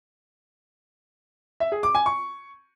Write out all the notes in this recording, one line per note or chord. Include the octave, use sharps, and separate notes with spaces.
E5
G#4
D6
G#5
C#6